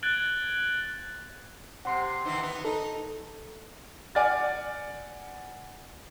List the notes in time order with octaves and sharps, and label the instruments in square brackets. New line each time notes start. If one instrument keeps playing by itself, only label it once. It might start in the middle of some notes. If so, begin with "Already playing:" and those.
[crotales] F#6 G#6 A6 D7 F#7 G7
[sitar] C3 [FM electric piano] F#5 C6 C7
[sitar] D#3 E3 E4
B3
[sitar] D#4 [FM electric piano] A4
[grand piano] D5 F#5 G#5 F6 A6